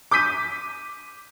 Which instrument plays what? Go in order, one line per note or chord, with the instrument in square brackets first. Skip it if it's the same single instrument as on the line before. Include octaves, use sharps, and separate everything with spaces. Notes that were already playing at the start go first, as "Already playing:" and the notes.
[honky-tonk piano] D6 G6 B6 D#7